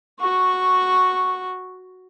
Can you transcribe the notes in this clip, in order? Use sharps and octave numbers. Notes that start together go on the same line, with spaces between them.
F#4 C#6